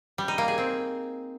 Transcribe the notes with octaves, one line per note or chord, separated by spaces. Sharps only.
G3
D#4
A#3
G#4
C4